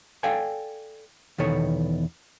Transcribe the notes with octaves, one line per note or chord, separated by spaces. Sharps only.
A4 D5 F5 G5 G#5
E2 B2 D#3 B3 A4 C#5